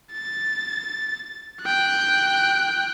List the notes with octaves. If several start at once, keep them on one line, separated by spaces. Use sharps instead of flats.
A6
G5 F#6